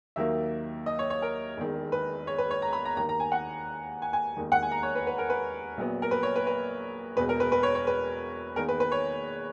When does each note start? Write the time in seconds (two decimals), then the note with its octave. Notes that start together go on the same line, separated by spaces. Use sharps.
0.16 D#2 D#3 F#3 A#3 E5
0.86 D#5
0.99 C#5
1.10 C#5
1.22 A#4
1.57 E1 E2 D#3
1.92 B4
2.27 C#5
2.38 B4
2.51 C#5
2.62 A#5
2.73 B5
2.85 A#5
2.97 D#2 D#3 A#3 A#5
3.09 A#5
3.20 G#5
3.32 F#5
4.02 G#5
4.13 G#5
4.36 E1 D#2 D#3
4.52 F#5
4.63 G#5
4.71 A#5
4.83 C#5
4.95 B4
5.07 B4
5.18 A#4
5.30 B4
5.77 A#1 A#2 F#3 B3
6.02 A#4
6.11 B4
6.23 C#5
6.36 B4
6.47 B4
7.16 E1 E2 B2 B4
7.29 A#4
7.40 B4
7.52 B4
7.63 C#5
7.75 C#5
7.87 B4
8.56 E2 D#3 A#3 A#4
8.68 B4
8.80 B4
8.92 C#5